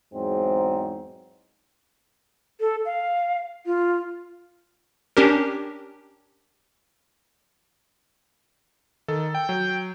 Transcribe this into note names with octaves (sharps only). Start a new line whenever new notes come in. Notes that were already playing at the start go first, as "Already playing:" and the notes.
E2 G#2 F#3 C4
A4
F5
F4
C#4 D4 G4 A#4
D#3 A4
G5
F#3